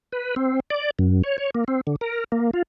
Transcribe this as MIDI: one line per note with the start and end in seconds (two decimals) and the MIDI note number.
0.12 0.35 71
0.36 0.60 60
0.70 0.90 74
0.99 1.22 42
1.24 1.38 73
1.38 1.50 73
1.55 1.64 58
1.68 1.81 60
1.87 1.96 50
2.01 2.24 70
2.32 2.51 58
2.53 2.62 65